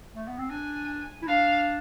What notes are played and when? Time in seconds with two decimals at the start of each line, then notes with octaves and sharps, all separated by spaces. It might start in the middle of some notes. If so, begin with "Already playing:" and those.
0.16 A3
0.27 B3
0.39 C4
0.50 D4 G#5
1.22 E4
1.27 D4 F5